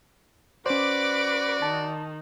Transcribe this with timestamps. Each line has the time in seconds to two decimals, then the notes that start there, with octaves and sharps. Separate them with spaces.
0.66 C#4 F#4 B4 C5 D5 B5 D6
1.62 D#3 A5